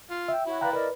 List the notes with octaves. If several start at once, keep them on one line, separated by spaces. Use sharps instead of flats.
F4
E5 G5 E6
E4 F#4 C#5 B5
B4 D5 F5 G5 A#5 F#6
A#4 B4 D5 D#5